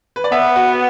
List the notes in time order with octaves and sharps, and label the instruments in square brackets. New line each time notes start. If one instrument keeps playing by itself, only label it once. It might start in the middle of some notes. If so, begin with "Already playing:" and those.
[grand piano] B4
D5
[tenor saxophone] B3 [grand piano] B4 E5
[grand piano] F#4 B4